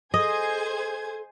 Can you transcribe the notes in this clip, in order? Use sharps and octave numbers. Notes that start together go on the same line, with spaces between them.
G#4 A4 C5 D#5 G#6